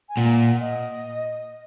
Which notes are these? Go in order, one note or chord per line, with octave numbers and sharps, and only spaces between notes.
G#5
A#2 F#5
D#5